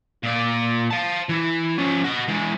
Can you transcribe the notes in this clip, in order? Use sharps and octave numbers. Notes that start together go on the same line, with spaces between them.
A#2 D5
F5 A5
E3
F3 C#4
F#4 D#5
E2 G#3